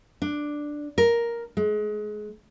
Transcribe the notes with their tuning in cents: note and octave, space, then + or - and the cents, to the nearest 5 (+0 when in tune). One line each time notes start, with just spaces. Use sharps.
D4 +5
A#4 +5
G#3 +25